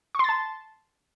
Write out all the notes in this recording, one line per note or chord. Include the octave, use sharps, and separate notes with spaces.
A5 C6 C#6 A6